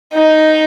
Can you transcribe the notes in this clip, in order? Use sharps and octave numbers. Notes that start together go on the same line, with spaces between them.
D#4